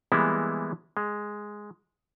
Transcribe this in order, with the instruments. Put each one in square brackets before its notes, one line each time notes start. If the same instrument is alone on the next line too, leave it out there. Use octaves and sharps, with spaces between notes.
[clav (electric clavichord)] E3 G3 G#3 A#3 B3 E4
G#3